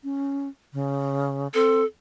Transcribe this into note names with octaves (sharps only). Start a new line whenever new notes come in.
C#4
C#3
C4 A4